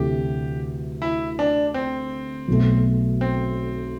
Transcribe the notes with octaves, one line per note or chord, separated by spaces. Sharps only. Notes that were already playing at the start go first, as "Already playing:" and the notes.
Already playing: D2 C3 E3 A3 G4
E4
D4
C4
B1 B2 A3
C4